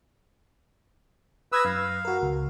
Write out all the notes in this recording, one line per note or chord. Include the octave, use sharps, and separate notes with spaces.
B4 D#6 E6 G#6 A#6
F#2 F5
F#4 A#4
C#2